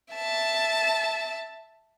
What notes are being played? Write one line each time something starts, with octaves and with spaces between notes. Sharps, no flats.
E5 A5